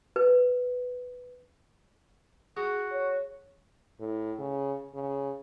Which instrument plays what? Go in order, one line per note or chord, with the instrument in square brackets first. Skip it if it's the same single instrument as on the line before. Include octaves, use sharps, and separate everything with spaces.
[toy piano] B4
[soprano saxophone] F#4 [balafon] G#4
[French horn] C#5
[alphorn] A2
C#3
C#3